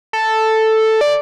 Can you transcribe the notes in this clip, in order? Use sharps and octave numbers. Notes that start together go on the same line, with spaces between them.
A4
D5